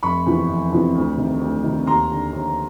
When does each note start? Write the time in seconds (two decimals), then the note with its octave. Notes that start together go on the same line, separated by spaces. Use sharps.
0.03 F1 B5 C#6
0.26 E2 C3 E3
0.49 F1
0.72 E2 C3 E3
0.95 D2
1.17 C3 D#3
1.41 D2
1.64 C3 D#3
1.87 D#2 A#5 C6
2.10 D3
2.33 D#2